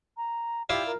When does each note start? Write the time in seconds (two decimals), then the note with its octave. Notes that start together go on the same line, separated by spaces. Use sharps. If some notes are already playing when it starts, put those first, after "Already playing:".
0.17 A#5
0.69 E4 F4 G4 D5
0.86 A#4